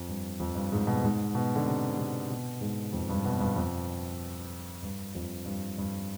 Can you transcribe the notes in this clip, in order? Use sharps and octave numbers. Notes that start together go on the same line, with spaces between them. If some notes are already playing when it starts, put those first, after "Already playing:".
Already playing: F2
G2
F2
G2
G#2
B2
G#2
B2
D3
C3
C3
B2
G#2
F2
G2
B2
G2
F2
G2
F2
G2
G2